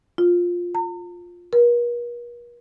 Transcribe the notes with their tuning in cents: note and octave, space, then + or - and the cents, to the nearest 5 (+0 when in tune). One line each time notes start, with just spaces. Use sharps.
F4 +10
A#5 -45
A#4 +45